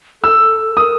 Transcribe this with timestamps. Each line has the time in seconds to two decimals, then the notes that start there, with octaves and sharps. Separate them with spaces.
0.23 A4 E6
0.77 A#4 D#6